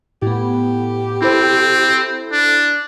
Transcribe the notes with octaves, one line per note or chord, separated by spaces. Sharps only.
A2 B3 G4
C4 E4 A4 C5
D4